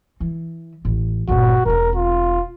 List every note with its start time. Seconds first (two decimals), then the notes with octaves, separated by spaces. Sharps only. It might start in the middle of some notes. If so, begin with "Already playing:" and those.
0.20 E3
0.85 A1
1.28 G1 A#2 F#4
1.65 E1 C4 A#4
1.96 F4